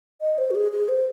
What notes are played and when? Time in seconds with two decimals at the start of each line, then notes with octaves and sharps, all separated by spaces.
0.21 D#5
0.38 C5
0.51 F#4
0.55 G#4
0.72 G#4
0.89 C5